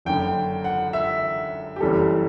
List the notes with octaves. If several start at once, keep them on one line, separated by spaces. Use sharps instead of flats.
F#1 F#2 D3 G5
F#5
E5
G4
F#1 F#2 E3 G3 A4